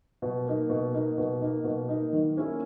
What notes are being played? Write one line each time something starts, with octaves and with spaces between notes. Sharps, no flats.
B2
A#3 D#4
B2
A#3 D#4
B2
A#3 D#4
B2
A#3 D#4
D#3
A#3 C#4 E4